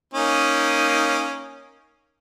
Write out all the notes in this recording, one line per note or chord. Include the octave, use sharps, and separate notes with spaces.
A#3 C#4 D#4